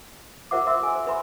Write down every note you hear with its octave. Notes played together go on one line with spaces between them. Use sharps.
F4 A#4 C5 E5 F#5 D6
E5 C6 E6
A4 G#5
C5
B4 E5 G#5 B5 C6